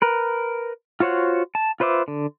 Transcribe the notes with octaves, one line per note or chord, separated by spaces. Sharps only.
A#4 B4
F4 F#4 C5 C#5 F#5
A5
F4 B4 C5 E5 D6
D3